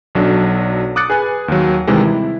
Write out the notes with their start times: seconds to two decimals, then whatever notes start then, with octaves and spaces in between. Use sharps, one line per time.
0.15 B1 F#3 D4 A4
0.96 D6 D#6 F#6 A6 C#7
1.10 G#4 B4 G#5 F#6
1.48 D#2 F#3
1.87 C3 D#3 E3 G3 G#3
2.06 E4